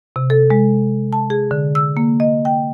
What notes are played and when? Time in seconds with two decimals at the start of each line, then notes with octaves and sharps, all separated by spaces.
0.16 C3
0.30 A4
0.50 G#3
1.13 A5
1.30 G#4
1.51 D3
1.75 E6
1.97 A#3
2.20 D#5
2.45 G5